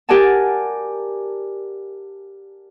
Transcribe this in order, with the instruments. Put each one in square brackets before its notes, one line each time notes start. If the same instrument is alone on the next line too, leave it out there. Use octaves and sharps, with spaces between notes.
[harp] G4 A#4 D5 F#5 G#5 A5